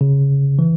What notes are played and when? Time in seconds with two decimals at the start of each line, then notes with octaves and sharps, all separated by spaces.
0.01 C#3
0.59 E3